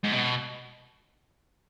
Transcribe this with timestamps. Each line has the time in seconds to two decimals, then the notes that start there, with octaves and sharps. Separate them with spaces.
0.04 G#2
0.12 B2